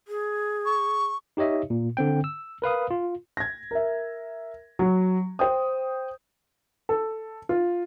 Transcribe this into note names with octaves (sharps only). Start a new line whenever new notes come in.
G#4
C#6
D#4 G4 C#5 D#5 E5
A#2
D3 C4 G5
E6
A#4 B4 F5 D#6
F4
G#6 A#6
A#4 E5
F#3
C5 G5 D#6
A4
F4